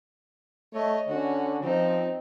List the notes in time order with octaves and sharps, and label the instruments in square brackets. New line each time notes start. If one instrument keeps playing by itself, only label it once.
[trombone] A3 [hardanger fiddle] C#5 D#5
[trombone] D3 [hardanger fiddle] C#4 F#4
[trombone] F3 [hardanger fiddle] C4 D#4